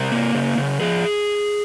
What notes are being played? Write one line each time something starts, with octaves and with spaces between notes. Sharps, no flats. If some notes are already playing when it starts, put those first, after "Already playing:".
Already playing: C3 A#4
A#3
C#3
C#3
F3 G#4